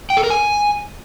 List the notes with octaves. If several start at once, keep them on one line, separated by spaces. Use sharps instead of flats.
G5
A4
A#4
G#5